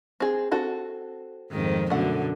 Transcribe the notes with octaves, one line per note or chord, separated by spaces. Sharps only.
C4 G#4
C4 F#4 A4
F2 G#2 D#3
F#2 B2 D3 A3 F#5